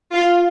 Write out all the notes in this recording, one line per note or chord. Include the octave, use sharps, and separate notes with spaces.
F4